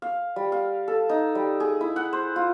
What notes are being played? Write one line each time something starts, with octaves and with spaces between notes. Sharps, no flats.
F5
G3
F5
A4
D#4
G3
G#4
E4
F#5
C5
F4